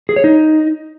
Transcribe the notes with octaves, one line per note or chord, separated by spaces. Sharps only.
G#4
C#5
D#4